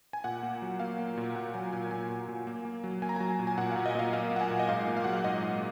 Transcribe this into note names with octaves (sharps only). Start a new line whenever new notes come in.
G#5
A#2 F#5
A#3
F#3
A#3 F5
A#3
A#2
A#2 F#5
F#3 G#5
A#2 G#5
A#2 G#5
A#2
A#2
A#3
A#3
F#3
A#3 G#5
A#5
F#3 G#5
A#2
G#5
A#2 F#5
A#2 F5
D#5
A#2 F5
A#3 F5
A#3 F#5
G#5
A#2
D#5
G#2 F5
A#3
F5
F#3 F#5
F5
G#2 D#5
G#2